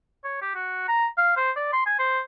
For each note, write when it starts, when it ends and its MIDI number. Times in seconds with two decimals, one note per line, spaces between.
0.24 0.39 73
0.42 0.54 67
0.55 0.84 66
0.88 1.06 82
1.18 1.32 77
1.37 1.51 72
1.56 1.69 74
1.73 1.82 84
1.86 1.98 80
1.99 2.20 72